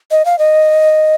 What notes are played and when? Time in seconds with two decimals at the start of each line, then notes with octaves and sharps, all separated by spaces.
0.11 D#5
0.25 F5
0.39 D#5